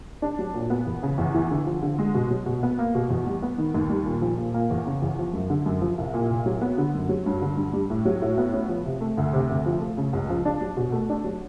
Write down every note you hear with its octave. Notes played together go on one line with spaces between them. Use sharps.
D4
F#3
A#2
B3
E2
C#3
E2
E3
D3
F3
D3
G#3
B2
F#3
B2
B3
A#3
B2
E2
G3
B3
D#3
D#2
G3
A#2
F3
A#2
A#3
E2
C#3
E2
F3
F#2
D3
F#2
F3
C2
A#2
C2
F#3
B3
D3
F#2
F#3
G2
D3
G2
G3
A2
F#3
A2
B3
C#4
F3
C3
A3
D2
C3
D2
F3
A3
C#3
C#2
F3
D4
F#3
B2
A3
D4
F#3